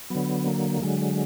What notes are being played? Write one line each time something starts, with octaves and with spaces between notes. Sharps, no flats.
D3 F#3 B3
A#3
D3 F#3 G#3